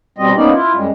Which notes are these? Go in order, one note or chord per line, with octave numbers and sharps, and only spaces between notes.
B2 G3 C4 D#5
A#3 B3 C#4 D#4 D5
E4 F4
F#2 G3 G#3